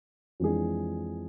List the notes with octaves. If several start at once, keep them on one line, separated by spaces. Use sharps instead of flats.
F2 E3 G#3 D4 G#4